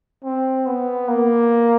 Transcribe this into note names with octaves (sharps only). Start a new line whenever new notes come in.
C4
B3
A#3